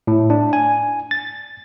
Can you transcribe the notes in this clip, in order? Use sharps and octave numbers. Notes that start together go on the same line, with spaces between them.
A2
D4
G#5
A6